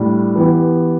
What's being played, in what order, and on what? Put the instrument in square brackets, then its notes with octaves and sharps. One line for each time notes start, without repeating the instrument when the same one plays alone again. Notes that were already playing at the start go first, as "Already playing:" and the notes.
Already playing: [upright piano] A2 G3 D4
E3 B3 G4